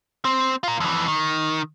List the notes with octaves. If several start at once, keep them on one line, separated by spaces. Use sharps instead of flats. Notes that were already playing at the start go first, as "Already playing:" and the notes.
C4
F4 A#4
F2 E3
D#3